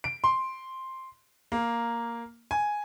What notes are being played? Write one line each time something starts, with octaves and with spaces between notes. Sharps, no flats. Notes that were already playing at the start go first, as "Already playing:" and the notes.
D7
C6
A#3
G#5